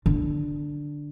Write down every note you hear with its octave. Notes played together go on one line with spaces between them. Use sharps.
D3